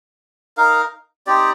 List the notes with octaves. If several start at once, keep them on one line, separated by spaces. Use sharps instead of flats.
D#4 A#4 F5
C4 D#4 G4 D5